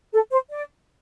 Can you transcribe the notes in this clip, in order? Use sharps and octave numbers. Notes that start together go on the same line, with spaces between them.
A4
C5
D5